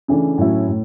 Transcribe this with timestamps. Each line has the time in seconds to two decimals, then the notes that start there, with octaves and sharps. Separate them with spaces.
0.08 C#3 E3 A3 D4
0.38 A2 F#3 C#4 E4
0.68 A2